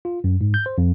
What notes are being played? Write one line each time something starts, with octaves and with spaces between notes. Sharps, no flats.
F4
F#2
G#2
G6
C5
F2